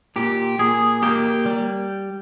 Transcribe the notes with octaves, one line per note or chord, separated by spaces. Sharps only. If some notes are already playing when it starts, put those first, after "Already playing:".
A#2 G4
A#2 G#4
A#3 G4
G3